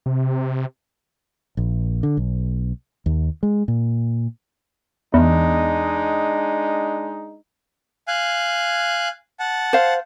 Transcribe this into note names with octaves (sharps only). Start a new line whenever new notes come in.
C3
A#1
D3
B1
D#2
G#3
A#2
E2 G#3 D4 D#4
F5 G#5 F#6
F#5 A5
C5 F5